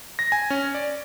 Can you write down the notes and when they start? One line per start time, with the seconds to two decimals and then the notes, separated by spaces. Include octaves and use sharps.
0.19 A#6
0.32 G#5
0.50 C#4
0.75 D5